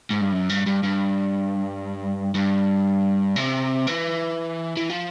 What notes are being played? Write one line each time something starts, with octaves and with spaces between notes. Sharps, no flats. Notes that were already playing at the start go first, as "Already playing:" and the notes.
G#2
G2
F#2
G2
G2
G2
G2
C3
E3
E3
F3